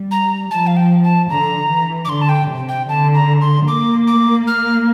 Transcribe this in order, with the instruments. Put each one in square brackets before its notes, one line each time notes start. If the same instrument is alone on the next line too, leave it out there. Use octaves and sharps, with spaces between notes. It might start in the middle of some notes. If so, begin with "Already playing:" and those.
Already playing: [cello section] G3
[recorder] A#5
[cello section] F3 [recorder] A5
[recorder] F5
G5
A5
[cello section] D3 [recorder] A#5
[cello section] E3
[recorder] D6
[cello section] D3 [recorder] C6
[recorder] A5
G5
[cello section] C3
[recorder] G5
[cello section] D3 [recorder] A5
[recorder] A#5
C6
[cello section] A#3 [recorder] D6
[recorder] D6
F6